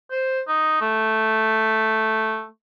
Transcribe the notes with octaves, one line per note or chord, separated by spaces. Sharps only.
C5
D#4
A3